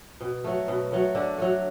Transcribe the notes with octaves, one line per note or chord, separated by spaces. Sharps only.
B2
F#3 A3
B2
F#3 A3
D3 D4
F#3 A3